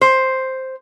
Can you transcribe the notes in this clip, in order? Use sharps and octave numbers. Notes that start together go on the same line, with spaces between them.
C5